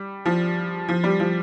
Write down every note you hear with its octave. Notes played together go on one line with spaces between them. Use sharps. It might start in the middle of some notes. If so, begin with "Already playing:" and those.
Already playing: G3
F3
F3
G3
F3